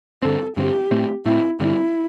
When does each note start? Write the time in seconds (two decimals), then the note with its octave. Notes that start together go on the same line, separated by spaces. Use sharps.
0.22 G2 D3 C4 A4
0.56 G2 D3 C4 G4
0.91 A2 A3 C4
1.26 A2 A3 C4 E4
1.60 G2 D3 G3 C4 E4